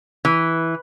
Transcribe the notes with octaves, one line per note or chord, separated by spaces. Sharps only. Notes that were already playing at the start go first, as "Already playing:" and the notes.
E3